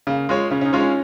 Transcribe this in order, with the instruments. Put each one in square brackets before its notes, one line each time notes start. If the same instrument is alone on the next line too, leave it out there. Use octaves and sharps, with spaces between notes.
[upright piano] C#3 [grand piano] A#3
[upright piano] G#3 F4 C#5
[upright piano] C#3 [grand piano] C#4
[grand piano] C#4
D#4
[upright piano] G#3 F4 C#5
[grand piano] C#4